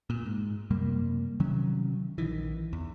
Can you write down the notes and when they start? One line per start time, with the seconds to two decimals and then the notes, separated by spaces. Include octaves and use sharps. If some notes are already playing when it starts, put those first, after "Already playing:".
0.10 A#2
0.26 G#2
0.70 F#2 C3 G3 A#3
1.40 C3 D#3 F#3 C#4
2.18 A#1 D#3 E3
2.73 E2